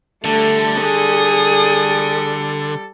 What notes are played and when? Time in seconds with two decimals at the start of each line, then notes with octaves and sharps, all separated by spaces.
0.24 D3 G3 A3 A4
0.80 G#4 D#6